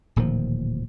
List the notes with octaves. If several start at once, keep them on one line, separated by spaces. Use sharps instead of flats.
D1 A#2 D#3 F3